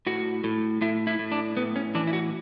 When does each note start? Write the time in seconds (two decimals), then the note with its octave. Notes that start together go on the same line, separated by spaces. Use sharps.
0.07 A2 F#4
0.44 A2
0.81 A2 E4
1.07 E4
1.19 A2
1.32 D4
1.57 A2 B3
1.76 C#4
1.95 E3 D4
2.07 E4
2.13 F#4